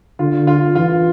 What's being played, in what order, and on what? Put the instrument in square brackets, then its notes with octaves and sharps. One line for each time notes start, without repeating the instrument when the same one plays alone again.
[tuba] D3 [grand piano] F4
[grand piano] F4
[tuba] E3 [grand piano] F4